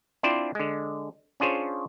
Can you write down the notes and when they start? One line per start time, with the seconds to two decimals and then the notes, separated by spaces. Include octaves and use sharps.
0.23 C4 D4 E4 F4 C5 D5
0.55 D3 G#3
1.40 C#4 D4 F4 G#4 C5 C#5